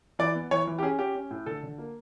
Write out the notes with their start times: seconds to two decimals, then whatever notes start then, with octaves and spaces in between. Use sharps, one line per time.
0.19 E3 D5
0.35 B3
0.51 E3 C#5
0.67 E3
0.79 G4
0.83 C#4 G#4
0.99 C#4 G4
1.15 C#4
1.31 A2
1.46 D3 A4
1.63 D3
1.78 A#3